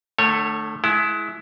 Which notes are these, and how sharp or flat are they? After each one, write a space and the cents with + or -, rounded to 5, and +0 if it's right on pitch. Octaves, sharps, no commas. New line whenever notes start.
D3 +40 A3 +0 C#5 -10
G#3 +30 E4 +0